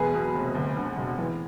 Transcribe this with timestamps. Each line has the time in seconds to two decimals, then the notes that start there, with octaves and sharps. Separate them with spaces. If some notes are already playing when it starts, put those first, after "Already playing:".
Already playing: E1 E2 G#4 B4
0.14 B2
0.35 F1
0.55 D2
0.77 D3
0.97 E1
1.18 E3